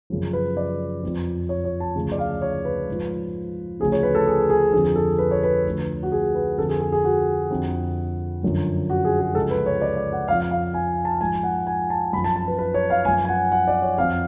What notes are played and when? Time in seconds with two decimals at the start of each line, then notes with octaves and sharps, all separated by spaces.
0.10 F#2 C#3 F3
0.33 B4
0.57 D5
1.03 F2 F3
1.49 C#5
1.65 C#5
1.80 A5
1.95 D2 C#3 F3
2.12 D5
2.18 F5
2.41 C#5
2.65 B4
2.88 G#2 F3
3.80 D2 C#3 F3 G#4
3.92 C#5
4.03 B4
4.15 A4
4.27 G#4
4.50 G#4
4.73 F2 D3 F3 G#4
4.96 A4
5.19 B4
5.31 C#5
5.43 B4
5.65 D2 D3 F3
6.03 F#4
6.12 G#4
6.35 B4
6.58 F2 D3 F3 A4
6.69 G#4
6.80 G#4
6.92 G#4
7.04 F#4
7.50 F2 D3 F3
8.43 F#2 D3 F3
8.90 F#4
9.05 G#4
9.20 G#4
9.35 C#2 C#3 F3 A4
9.51 B4
9.66 C#5
9.81 D5
9.97 D5
10.12 F#5
10.28 F2 F3 F5
10.51 F5
10.74 G#5
11.05 A5
11.21 G#2 F3 G#5
11.43 F#5
11.67 G#5
11.90 A5
12.13 F#2 B5
12.17 F3
12.24 A5
12.36 A5
12.48 B4
12.59 B4
12.74 C#5
12.90 F5
13.05 F3 G#5
13.08 F#2
13.25 G#5
13.29 F#5
13.52 F#5
13.67 D5
13.82 C#5
13.98 F2 F3 F5